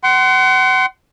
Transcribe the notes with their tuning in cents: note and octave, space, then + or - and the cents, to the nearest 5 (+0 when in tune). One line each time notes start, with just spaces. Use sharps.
F#5 +35 C6 -10